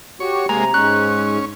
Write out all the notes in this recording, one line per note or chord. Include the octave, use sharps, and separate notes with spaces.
F#4 G4 C#5
C3 G#3 A#3 A#5
G#2 G#3 C#4 F#6